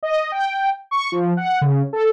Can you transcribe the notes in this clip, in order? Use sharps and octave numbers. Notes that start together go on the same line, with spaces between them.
D#5
G5
C#6
F3
F#5
C#3
A4